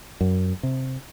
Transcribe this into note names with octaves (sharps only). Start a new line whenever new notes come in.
F#2
C3